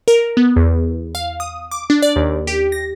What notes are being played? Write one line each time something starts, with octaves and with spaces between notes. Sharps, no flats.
A#4
B3
E2
F5
D#6
D6
D4
D5
D#2
G4
A#6